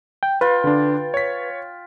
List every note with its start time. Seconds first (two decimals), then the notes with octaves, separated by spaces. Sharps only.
0.23 G5
0.41 F4 B4 G5
0.64 D3 D4
1.14 C#5 B6